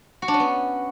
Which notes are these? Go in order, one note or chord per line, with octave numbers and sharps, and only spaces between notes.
F#4
D4
C#4
B3